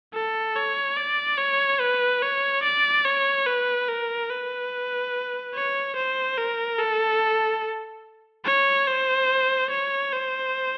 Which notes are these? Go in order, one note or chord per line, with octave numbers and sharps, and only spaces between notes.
A4
C#5
D5
C#5
B4
C#5
D5
C#5
B4
A#4
B4
C#5
C5
A#4
A4
C#5
C5
C#5
C5